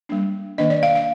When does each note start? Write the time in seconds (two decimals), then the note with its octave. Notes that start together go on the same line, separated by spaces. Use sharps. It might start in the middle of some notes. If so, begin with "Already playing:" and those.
0.09 G3 A#3 D4
0.58 D#3 A#3 D4 D#5
0.70 D5
0.83 F5
0.95 F5